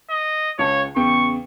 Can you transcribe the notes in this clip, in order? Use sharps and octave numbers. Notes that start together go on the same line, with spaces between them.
D#5
C#2 C#3 C#5 A5
E2 C#3 G5 C#6